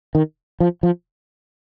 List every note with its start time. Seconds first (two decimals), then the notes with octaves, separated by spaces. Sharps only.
0.15 D#3
0.60 F3
0.83 F3